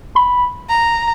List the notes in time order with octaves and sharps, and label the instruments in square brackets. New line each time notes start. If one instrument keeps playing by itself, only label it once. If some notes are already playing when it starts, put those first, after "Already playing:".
[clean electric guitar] B5
[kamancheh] A#5